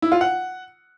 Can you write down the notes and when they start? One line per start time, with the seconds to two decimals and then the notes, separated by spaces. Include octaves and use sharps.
0.02 E4
0.12 F4
0.21 F#5